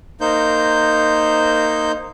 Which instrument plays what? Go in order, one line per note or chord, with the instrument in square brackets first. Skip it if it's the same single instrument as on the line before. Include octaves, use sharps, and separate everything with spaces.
[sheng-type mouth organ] A#3 D#4 C5 G6